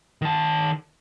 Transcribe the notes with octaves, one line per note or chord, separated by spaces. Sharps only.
D#3 A5